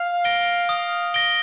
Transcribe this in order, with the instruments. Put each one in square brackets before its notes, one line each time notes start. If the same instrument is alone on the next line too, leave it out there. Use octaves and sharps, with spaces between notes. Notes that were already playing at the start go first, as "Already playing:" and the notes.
Already playing: [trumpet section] F5
[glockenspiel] A#6 D7 G7
D#6
A#6 D7 G7